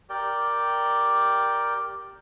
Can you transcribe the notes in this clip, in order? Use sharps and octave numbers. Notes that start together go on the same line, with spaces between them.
G4 A#4 D5 G5